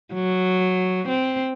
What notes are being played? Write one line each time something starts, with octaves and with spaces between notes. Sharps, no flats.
F#3
C4